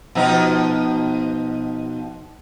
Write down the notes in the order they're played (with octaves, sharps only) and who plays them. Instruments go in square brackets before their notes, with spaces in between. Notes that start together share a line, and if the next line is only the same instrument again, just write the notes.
[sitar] B2 F3 D#4